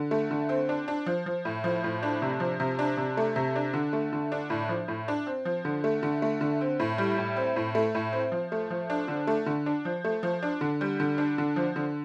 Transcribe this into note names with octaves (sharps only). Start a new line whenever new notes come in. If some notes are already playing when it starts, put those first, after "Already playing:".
Already playing: D3
A3
D3
C4
D4
D4
F3
F3
A2
F3
A2
D4
C3
F3
C3
D4
C3
A3
C3
D4
D3
A3
D3
D4
A2
F3
A2
D4
C4
F3
D3
A3
D3
A3
D3
C4
A2
G3
A2
C4
A2
A3
A2
C4
F3
A3
F3
D4
D3
A3
D3
D4
F3
A3
F3
D4
D3
G3
D3
D4
D3
F3
D3